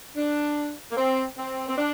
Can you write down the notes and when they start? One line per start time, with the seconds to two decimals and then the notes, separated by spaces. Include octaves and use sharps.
0.17 D4
0.91 A#3
0.97 C4
1.38 C4
1.68 C4
1.78 D4